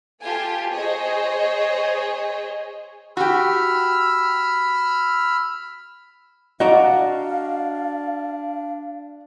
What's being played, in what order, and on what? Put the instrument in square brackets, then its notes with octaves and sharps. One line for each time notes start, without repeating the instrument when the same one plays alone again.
[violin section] F4 G4 A4 G#5 A5
G#4 C5 C#5 D#5
[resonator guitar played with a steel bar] F#4 G4 [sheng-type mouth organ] B5 E6 F6
[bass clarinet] D4 [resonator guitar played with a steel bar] F#4 D5 [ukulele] D#5 A#5 [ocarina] F5